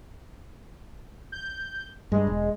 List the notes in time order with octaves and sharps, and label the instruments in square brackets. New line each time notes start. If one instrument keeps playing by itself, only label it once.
[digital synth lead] G6
[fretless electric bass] G2 [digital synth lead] G#3
[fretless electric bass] E1